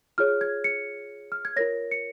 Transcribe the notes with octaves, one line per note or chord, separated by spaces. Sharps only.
F4 G#4 C#5 F6
G#6
C#7
F6
G#6
F4 A#4 C#5 A#6
C#7